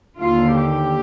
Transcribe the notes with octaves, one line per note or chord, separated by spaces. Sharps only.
D#2 D3 F4
G4